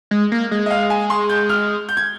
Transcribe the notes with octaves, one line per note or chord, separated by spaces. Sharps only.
G#3
A#3
G#3
D#5
F5
G#5
C6
G6
F6
G6
G#6